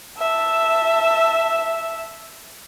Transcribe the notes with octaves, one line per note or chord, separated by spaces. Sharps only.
E5 A5